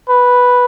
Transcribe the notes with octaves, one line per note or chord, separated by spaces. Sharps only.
B4